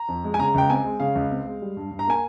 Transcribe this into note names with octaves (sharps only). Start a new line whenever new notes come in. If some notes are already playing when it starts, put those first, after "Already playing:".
Already playing: A#5
F2
G#3
G#5
C#3 A#5
C#2 G5
C4 G#5
G#3
C#3 F5
C#2
C4
G#3
G3
G2
G2
A#5
A#3 G#5